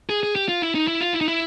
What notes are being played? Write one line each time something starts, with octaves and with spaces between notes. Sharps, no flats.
G#4
G#4
G4
F4
E4
D#4
E4
F4
E4
D#4
E4